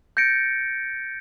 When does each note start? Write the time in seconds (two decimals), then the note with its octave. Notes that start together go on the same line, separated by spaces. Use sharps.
0.17 G6 A6 A#6 C#7 D7